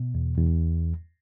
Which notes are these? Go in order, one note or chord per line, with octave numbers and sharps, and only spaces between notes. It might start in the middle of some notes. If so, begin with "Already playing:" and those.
Already playing: B2
E2
E2